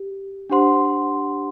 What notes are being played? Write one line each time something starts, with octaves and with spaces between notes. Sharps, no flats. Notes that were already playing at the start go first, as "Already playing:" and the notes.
Already playing: G4
D4 G4 C5 F#5 C6